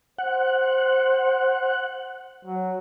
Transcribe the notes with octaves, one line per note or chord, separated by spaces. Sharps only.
C5 F#5
F#3